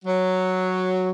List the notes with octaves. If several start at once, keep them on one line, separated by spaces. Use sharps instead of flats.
F#3